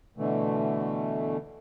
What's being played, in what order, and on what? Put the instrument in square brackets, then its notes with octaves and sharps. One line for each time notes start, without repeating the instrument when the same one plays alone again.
[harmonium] B2 D3 E3 A3